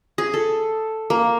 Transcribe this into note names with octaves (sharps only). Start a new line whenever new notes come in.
G#4
A4
A#3